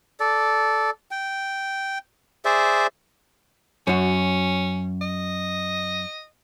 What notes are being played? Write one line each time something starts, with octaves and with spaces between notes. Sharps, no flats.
A4 D5
G5
G#4 C5 D5 E5
F#2 C#4 F#4
D#5